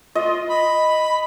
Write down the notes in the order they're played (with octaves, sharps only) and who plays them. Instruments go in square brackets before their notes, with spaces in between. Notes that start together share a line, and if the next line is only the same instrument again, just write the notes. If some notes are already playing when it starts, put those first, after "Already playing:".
[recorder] F4 [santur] D#5
[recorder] B5